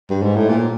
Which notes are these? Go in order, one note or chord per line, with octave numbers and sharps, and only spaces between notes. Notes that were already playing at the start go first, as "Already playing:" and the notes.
G2
G#2
A2
A#2